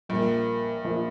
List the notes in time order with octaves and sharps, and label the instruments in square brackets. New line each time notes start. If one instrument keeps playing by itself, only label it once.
[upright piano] A#1 A#2 A#3 [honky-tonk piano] G2
[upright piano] A#1 A#2 F3